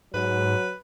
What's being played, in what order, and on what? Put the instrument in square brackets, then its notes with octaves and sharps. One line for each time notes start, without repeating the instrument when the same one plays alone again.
[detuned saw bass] G#2 [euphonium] F#3 [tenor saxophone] B4